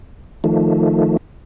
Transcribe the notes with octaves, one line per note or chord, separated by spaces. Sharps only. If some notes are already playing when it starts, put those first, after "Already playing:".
D#3 F3 A3